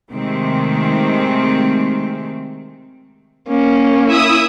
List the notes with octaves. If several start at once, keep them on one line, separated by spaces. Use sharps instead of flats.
C3 D#3 G#3 A3 C4
A#3 C#4
E4 E5 D#6